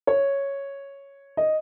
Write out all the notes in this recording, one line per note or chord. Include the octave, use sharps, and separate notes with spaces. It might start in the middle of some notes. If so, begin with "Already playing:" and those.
C#5
D#5